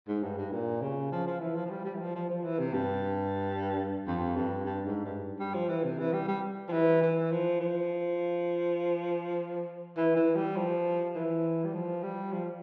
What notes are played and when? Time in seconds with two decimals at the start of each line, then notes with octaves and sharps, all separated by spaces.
0.08 G#2
0.23 G2
0.38 G2
0.52 A#2
0.81 C#3
1.12 F3
1.27 F3
1.40 E3
1.55 F3
1.65 F3
1.70 G3
1.85 G3
1.95 E3
2.00 F3
2.15 F3
2.30 F3
2.44 E3
2.59 C3
2.74 G2
4.07 F2
4.36 G2
4.65 G2
4.86 G#2
5.05 G2
5.39 G3
5.54 F3
5.69 E3
5.84 C3
5.99 E3
6.13 G3
6.28 G3
6.68 F3
6.72 E3
7.02 E3
7.31 F3
7.60 F3
9.97 E3
10.16 E3
10.35 G3
10.56 F3
11.15 E3
11.65 G3
11.73 F3
12.03 G3
12.32 F3